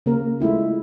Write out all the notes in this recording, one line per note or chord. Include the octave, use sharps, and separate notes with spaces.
C#3 A#3 A#4
G#3 A3 E4 F4